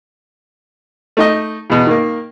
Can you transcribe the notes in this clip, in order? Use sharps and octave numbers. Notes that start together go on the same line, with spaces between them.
A3 D#4 D#5
E2 B2
D#3 A#3